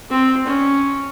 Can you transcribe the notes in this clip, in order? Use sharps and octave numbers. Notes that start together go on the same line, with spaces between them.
C4
C#4